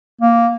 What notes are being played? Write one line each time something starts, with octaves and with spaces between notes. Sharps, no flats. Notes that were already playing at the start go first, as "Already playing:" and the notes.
A#3